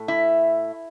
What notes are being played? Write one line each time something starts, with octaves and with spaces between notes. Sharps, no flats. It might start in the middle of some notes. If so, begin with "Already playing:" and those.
Already playing: A2 A3
E4